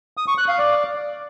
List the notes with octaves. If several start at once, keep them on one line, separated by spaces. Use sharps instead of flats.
D#6
C#6
F#6
F5
D5